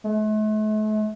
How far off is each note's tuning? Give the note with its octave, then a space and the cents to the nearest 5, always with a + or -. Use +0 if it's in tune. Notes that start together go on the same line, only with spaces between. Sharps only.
A3 -45